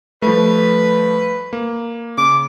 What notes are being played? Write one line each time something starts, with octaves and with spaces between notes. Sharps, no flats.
F3 G3 A3 B4
A#3
C#3 D6